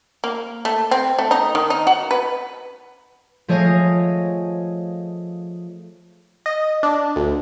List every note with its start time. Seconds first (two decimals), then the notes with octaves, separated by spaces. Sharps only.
0.24 A#3
0.65 A3
0.91 C4
1.19 A3
1.31 D#4
1.55 D#3
1.70 D#4
1.87 F#4
2.11 B4
3.48 F3 A3 G#4 C#5 D#5 F5
6.46 D#5
6.83 D4
7.16 D2